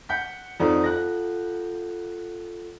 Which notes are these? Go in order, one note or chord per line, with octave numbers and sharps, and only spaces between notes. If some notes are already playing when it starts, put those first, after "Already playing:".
F#5 G6 B6
F2 D4 D#4 F4 A4 F#5
F#6 A#6